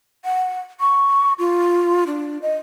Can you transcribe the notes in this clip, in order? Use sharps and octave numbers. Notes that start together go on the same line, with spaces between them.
F#5
C#6
F4
D4
D#5